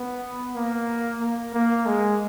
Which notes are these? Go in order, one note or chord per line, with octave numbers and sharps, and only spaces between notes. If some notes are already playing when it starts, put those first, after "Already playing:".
Already playing: B3
A#3
A#3
A#3
G#3